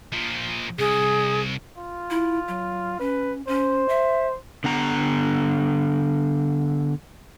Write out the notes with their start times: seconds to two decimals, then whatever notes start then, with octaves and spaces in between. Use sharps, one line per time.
0.13 A#2 F3
0.79 C2 G#4
1.78 F4
2.10 E4
2.48 F#3
2.99 C#4 B4
3.47 C#4 C5
3.88 E5
4.64 D3 B3 A#5